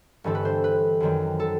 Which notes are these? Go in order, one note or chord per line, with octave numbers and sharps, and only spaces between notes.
G1 G2 E3 A3 C4 A4
B4
C5
B4
F#2 D#3 F#3 C4
A4